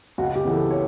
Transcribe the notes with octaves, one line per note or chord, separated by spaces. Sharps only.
C#2 F#4
G4
C#3 E3 B3
A4
C#5